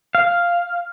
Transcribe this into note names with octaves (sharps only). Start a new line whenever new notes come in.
F5